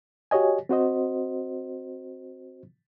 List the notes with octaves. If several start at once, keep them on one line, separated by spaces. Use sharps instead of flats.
F#4 G4 C#5 D#5 G#5
C4 F#4 C5 D#5